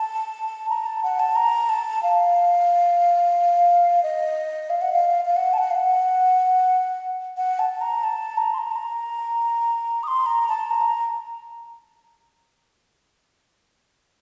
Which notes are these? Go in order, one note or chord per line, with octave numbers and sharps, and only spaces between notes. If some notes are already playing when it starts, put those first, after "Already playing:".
Already playing: A5
A#5
A5
F#5
A5
A#5
A5
F5
D#5
F5
F#5
F5
F5
F#5
A5
F#5
F5
F#5
F#5
A5
A#5
A5
A#5
C6
A#5
A5
A#5
D#6
C6
A#5
A5
A#5